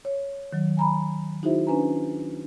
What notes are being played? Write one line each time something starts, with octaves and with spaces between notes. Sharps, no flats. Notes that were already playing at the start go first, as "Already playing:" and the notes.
C#5
D#3 F#3
G#5 A#5 B5
D#4 E4 F#4 G#4 C5 E5
C#4 D4 B4 G#5 A#5